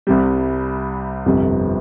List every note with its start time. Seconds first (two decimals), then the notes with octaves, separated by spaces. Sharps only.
0.07 C2 C3 G3
1.26 G1 F2 C3 G3